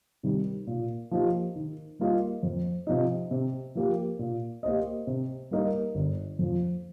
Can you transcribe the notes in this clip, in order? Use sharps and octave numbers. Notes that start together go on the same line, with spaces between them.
C3 D#3 G3
A#2
F3 A#3 D#4 G4
D#3
G3 A#3 F4 D#5
F2
C3 F3 D#4
C3
F3 A#3 G4
A#2
A#3 G4 C5 D#5
C3
G3 A#3 D#4 A#4
G1
F2 F3